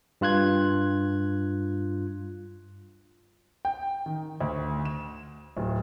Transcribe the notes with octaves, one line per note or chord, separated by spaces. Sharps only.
G2 F4 F#6 G#6
G5
D#3
D2
E7
D1